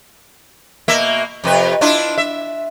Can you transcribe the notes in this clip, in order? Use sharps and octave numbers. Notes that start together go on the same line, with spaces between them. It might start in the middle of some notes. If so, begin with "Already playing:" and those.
B2 A#3 E5
F2 C3 B4
D4 E4 F4
E5